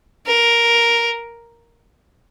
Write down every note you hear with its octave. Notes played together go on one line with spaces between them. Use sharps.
A#4